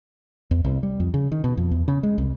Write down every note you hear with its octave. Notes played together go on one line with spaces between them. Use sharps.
E2
C2
G3
F2
C#3
D#3
B2
F2
E2
C#3
G#3
C2